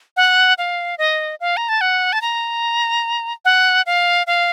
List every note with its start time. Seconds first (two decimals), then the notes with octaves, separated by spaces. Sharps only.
0.17 F#5
0.58 F5
0.98 D#5
1.40 F5
1.57 A#5
1.69 A5
1.81 F#5
2.13 A5
2.22 A#5
3.45 F#5
3.86 F5
4.27 F5